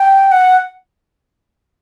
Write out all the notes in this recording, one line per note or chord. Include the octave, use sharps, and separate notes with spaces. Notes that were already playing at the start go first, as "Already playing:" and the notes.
Already playing: G5
F#5